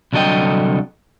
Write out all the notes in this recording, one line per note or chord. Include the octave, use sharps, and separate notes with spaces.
C2 D3 F#3 A4 D#5 G5